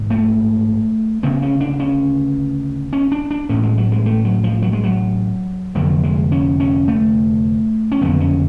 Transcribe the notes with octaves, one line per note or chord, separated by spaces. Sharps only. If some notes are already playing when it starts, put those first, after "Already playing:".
Already playing: A1 G#2
A3
D2 C#3 B3
C#4
D4
C#4
C#4
D4
D4
A1 A2 C#4
G#3
F#3
G#3
A3
F#3
F3
F#3
G#3
F#3
F1 F2 D3 F#3
G#3
C#4
C#4
A3
C#4
F#1 F2 D3 B3
C#4